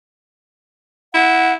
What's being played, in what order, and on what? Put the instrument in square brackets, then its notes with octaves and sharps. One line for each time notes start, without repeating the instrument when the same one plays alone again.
[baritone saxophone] E4 [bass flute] F#5